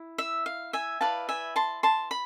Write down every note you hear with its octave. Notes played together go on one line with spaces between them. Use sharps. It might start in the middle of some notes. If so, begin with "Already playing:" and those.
Already playing: E4
E5
F5
E5 G#5
E4 B4 D5 F5 A5
E5 G#5
A5 C6
A5 C6
B5